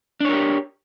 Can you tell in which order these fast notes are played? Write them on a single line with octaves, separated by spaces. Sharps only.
D4 C#5 A#4 G4